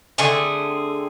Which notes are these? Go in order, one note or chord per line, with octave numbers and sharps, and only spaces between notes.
D3 A3 C4 G#4